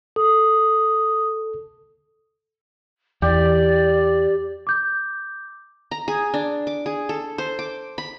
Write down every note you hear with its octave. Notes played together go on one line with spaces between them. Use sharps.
A4 D#6
E2 G4 D5
D6 G6
A#5
G#4
D4
D6
G#4
A4
C5
D6
B5